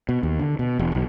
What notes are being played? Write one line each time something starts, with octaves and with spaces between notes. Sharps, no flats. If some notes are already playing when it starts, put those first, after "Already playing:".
B2
D#2
D3
B2
E1
B1